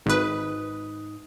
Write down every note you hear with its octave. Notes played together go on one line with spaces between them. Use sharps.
G#1 G#2 D#4 B4 D#6